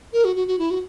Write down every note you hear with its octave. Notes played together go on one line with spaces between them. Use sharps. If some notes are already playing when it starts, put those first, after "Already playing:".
A#4
F#4
F#4
F#4
E4
F#4